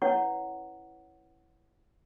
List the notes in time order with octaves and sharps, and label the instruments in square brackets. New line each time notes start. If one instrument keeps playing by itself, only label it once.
[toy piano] C#4 E4 B4 C#5 F#5 C#6